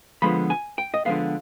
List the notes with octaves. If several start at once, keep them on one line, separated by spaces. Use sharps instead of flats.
D3 F3 G#3 B3 B5
G#5
G5
D#5
D3 F3 G#3 B3 F5